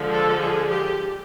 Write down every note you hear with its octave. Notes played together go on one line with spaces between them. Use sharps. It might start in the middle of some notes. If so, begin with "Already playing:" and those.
Already playing: D3 F3 G#3
A4
G#4
G4